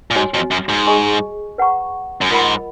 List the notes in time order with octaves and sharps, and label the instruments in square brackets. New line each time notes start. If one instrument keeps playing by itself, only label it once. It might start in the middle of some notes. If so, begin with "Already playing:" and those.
[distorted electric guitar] A#2
[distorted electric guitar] G#2 [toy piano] F#4 C#5 G#5
[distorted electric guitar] F2
F#2
G#2
[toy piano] G#4 D#5 G#5 C#6
B4 F#5 A#5 C#6
[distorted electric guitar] F#2
[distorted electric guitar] G#2 [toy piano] F4 A#4 D#5 F#5 B5